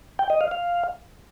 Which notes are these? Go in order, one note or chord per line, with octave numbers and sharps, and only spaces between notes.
G5
D#5
F5
F5